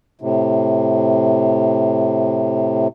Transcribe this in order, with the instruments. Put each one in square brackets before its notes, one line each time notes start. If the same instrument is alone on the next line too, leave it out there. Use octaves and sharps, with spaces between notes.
[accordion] A2 C3